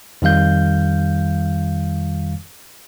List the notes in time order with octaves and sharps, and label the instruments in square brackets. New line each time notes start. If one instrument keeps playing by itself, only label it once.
[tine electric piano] F2 D#3 G3 F5 G6